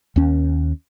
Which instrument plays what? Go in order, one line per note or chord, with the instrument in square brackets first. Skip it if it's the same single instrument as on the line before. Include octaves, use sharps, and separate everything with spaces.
[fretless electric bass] D#2 C#4